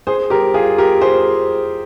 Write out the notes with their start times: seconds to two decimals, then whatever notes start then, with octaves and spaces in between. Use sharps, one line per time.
0.07 G#4 C5
0.30 G4 A#4
0.54 F4 G#4
0.78 G4 A#4
1.01 G#4 C5